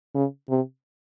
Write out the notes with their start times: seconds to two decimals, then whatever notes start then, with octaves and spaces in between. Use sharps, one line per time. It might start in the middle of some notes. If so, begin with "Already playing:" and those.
0.14 C#3
0.49 C3